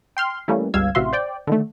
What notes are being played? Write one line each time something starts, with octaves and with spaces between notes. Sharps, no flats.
G5 C6 F6
E3 G3 A3 A#3 C#4
G1 C#2 G2 F5 E6 G#6
A1 C3 F#4 E5 F5 C6
C5 D5 G5
D3 D#3 A3